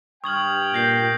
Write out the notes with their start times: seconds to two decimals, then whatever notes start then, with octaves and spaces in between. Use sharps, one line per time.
0.24 G2 G5 C#6 D#6 F6 G#6 F#7
0.74 A#2 G6 A#6 C7